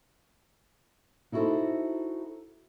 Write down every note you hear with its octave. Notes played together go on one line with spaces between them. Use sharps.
D#4 E4 F#4 G4 A4 C5